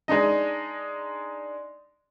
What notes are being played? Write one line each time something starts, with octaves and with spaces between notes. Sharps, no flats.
G#3 D4 D#4 D#5